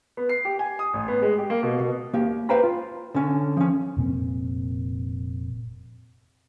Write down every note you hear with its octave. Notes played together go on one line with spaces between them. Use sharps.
B3
C7
G4
G#5
D#6
A1
B3
G#3
G4
A#3
B2
B2
A#3 G4
B4 C5 F5 G5 A#5 B5
F4
D3 C#4
F3 C#4
F1 A#2 A#3 C4